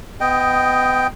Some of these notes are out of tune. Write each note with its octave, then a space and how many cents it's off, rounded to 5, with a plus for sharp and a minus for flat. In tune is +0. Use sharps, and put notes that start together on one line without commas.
B3 +30 D#5 +0 G5 +0